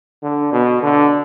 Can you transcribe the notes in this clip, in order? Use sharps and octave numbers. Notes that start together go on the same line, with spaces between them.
D3
B2
D3